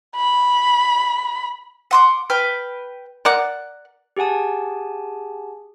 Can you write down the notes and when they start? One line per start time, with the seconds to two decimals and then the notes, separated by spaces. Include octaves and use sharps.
0.16 B5
1.91 F#5 C6 D6
2.30 B4 G5 F6
3.25 A#4 D5 F#5
4.17 G4 G#4 F#5 G#5 A5